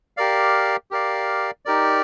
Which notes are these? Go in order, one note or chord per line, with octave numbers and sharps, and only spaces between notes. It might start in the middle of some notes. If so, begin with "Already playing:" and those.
G4 A#4 D5 F5
G4 A#4 D5 F5
D#4 G4 A#4 D5